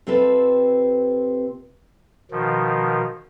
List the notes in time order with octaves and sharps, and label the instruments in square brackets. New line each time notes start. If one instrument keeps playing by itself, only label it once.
[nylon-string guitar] C3 C4 F4 A4 B4
[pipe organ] B2 D#3 F3